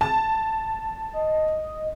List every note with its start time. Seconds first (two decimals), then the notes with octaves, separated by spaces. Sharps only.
0.01 A5
1.13 D#5